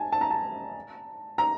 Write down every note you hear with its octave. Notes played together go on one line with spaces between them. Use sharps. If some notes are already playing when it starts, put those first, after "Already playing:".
Already playing: G#5 A5
A5
A#5
A5
A#5